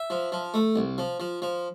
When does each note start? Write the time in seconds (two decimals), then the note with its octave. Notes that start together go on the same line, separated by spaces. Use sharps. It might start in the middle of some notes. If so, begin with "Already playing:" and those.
Already playing: E5
0.10 F3
0.32 F3
0.54 A3
0.76 C2
0.98 F3
1.20 F3
1.42 F3